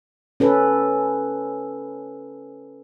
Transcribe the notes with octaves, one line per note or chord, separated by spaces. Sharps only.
C#4 A4 B4